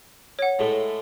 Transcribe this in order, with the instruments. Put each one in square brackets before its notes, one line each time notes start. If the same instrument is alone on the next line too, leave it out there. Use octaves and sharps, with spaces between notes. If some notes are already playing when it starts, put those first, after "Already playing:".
[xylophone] C#5 F#5
[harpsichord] A2 G#3 A3